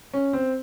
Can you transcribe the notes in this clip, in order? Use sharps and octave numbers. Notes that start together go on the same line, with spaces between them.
C#4
C4